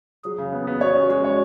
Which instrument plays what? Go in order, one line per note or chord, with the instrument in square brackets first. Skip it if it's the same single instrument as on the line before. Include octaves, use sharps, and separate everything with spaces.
[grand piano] F#3 [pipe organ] G#4
[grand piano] C#3
B3
B3
[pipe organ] F#4 [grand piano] C#5
[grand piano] C#4
[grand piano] G#3 [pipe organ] F#4
[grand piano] C#5